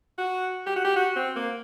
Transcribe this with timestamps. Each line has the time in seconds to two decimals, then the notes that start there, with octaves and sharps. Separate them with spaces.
0.18 F#4
0.66 G4
0.76 F#4
0.85 G4
0.96 F#4
1.16 C4
1.36 A#3